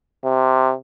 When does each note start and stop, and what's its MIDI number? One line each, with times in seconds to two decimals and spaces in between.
0.25 0.74 48